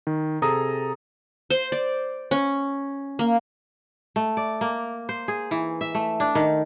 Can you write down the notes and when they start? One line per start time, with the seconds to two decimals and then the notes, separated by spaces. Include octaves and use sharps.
0.07 D#3
0.42 C3 G#4 A4 A#5 D#6
1.50 C5
1.72 D5
2.31 C#4
3.19 A#3
4.16 A3
4.37 D5
4.61 A#3
5.09 C5
5.28 G#4
5.51 E3
5.81 E5
5.95 A3
6.20 D4
6.35 D#3